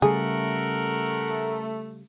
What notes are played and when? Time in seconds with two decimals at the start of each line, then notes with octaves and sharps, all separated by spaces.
0.02 C#3 G3 A3 G#4 A#4 F#5